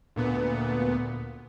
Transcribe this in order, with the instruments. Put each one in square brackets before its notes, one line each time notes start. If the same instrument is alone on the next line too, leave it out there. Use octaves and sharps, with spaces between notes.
[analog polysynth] D2 A#2 B3